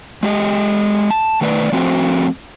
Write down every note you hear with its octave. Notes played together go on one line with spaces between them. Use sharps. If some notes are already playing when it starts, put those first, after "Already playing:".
G#3 G4 D#5
A5
D#3 A3 B4 D5
F3 A3 C4 F#4